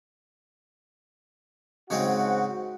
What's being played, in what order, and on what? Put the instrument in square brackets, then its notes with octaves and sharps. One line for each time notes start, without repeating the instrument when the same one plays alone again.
[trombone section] G#2 F#4 [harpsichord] C#3 G#3 C4